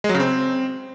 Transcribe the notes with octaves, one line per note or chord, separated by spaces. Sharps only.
G#3
F#3
C#3
C4